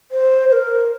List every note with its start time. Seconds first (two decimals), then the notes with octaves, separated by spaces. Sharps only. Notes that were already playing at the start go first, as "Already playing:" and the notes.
0.11 C5
0.49 C5
0.52 A#4